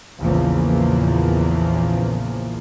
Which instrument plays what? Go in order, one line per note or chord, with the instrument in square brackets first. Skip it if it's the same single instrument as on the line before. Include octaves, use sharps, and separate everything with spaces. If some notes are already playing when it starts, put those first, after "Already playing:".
[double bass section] A#1 E2 C#3 E3 F3 A#3